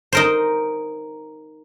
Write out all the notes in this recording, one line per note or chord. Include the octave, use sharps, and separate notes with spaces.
D#4 A#4 C5